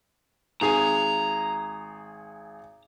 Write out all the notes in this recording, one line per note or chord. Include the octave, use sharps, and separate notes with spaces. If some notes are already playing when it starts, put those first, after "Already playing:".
G#1 G#4 G#5 A#5